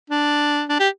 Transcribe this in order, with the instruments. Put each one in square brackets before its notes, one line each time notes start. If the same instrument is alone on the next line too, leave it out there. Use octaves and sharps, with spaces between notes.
[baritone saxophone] D4
D4
G4